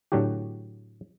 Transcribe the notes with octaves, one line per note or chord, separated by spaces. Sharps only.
A2 D3 F#3 F#4 G4